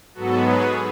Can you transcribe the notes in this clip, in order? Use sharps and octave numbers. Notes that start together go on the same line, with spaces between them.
G#2 F#3 B3 F#4 A4
G#4 B4